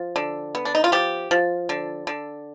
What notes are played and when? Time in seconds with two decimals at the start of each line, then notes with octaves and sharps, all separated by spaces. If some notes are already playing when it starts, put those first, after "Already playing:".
Already playing: F3
0.16 D3
0.55 B3
0.65 D4
0.75 D#4
0.84 F4
0.92 F3 G4
1.31 F3
1.69 D3
2.07 D3